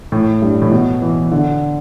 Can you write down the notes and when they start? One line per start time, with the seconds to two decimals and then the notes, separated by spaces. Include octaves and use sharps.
0.12 A2
0.42 G2
0.62 A2
0.71 B2
1.02 E3
1.32 D3